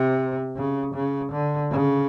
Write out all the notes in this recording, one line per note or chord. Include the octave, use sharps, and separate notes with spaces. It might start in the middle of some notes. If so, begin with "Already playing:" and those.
Already playing: C3
C#3
C#3
D3
C#3